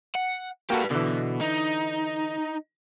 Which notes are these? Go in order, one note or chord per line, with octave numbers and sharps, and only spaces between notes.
F#5
A#3 F#4 G4 A4 B4
B2 D3 E3
D#4